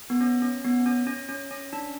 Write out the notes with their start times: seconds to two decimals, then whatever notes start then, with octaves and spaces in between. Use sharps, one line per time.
0.10 B3
0.21 C#4
0.42 C#4
0.65 B3
0.86 C#4
1.07 C#4
1.29 C#4
1.51 C#4
1.73 D4